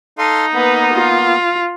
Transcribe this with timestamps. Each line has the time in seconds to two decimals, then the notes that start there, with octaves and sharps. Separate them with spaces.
0.18 D#4 A4 F5 C6
0.54 A#3 B3 B4
0.94 F4